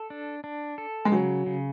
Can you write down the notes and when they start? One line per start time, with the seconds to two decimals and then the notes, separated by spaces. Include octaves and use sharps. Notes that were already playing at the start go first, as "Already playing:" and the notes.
Already playing: A4
0.10 D4
0.44 D4
0.78 A4
1.05 G#3
1.12 C#3 F#3
1.46 C#3